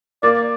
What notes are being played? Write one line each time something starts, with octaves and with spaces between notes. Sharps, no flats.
A#3 D5